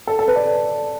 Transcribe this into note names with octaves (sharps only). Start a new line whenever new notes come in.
A4
A4
B4
D5